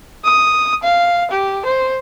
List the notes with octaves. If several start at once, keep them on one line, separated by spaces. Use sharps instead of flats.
D#6
F5
G4
C5